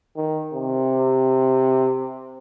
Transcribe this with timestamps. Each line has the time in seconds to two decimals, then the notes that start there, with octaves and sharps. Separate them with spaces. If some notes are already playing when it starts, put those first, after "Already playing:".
0.16 D#3
0.53 C3